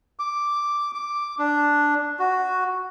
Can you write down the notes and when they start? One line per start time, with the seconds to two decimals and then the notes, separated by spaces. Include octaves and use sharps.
0.19 D6
0.94 D6
1.39 D4
2.19 F#4